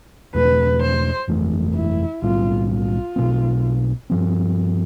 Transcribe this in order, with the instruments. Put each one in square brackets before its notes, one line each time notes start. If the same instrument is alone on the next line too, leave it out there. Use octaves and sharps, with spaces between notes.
[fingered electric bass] E2 B2 A3 D4 [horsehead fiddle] B4
[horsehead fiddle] C5
[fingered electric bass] G1 F2 E3 A3
[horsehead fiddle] E4
[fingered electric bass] B1 A2 G3 C4 [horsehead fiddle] F4
[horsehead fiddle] F4
[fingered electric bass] B1 B2 A3 C4
G2 F3 C4